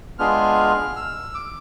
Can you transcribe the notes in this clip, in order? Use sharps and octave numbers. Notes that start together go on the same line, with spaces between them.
G#3 B3 D4 F4 G#4 F6
E6
D6